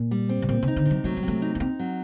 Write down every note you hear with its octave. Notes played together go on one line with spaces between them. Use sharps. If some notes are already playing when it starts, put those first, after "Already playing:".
Already playing: A#2
G3
C4
C3
A#2 C4
C3
D#4
D3
C3
F#3
F#3 A3
G3
C3
A3
D#4
A#3
C4 D#4
F#3